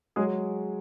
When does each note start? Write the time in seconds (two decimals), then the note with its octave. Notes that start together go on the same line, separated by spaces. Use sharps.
0.16 F#3 G#3 G#4